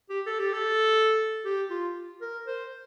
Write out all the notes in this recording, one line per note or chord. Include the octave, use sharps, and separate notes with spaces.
G4
A4
G4
A4
G4
F4
A#4
C5